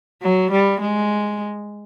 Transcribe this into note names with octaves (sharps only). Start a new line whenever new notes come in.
F#3
G3
G#3